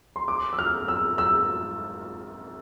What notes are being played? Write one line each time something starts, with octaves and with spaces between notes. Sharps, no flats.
C6
D6
E6
F6
E6
E6